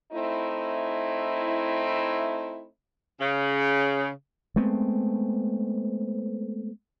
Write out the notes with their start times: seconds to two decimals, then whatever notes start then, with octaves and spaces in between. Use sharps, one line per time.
0.13 A3 C4 D#4 E4
3.21 C#3
4.56 G#3 A3 B3 C4